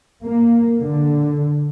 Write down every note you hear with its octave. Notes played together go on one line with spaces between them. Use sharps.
A#3
D3